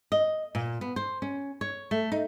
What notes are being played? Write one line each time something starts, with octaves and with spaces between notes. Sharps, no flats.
D#5
A#2
B3
C5
C#4
C#5
A3
D#4